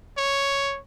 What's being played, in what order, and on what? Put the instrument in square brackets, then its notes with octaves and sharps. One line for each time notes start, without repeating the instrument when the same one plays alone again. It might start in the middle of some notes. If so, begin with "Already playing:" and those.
[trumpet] C#5